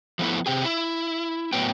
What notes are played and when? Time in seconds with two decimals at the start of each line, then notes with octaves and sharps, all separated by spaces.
0.19 F3 A3 B3 E4
0.46 C3 C4 G4 G#4
0.64 E4
1.52 A2 F#3 B3 G5